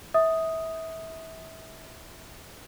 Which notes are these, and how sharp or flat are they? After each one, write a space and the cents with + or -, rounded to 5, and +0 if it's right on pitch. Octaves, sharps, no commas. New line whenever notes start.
E5 -25 D#6 +0